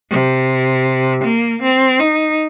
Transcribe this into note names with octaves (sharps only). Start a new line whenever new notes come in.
C3
A#3
C4
D#4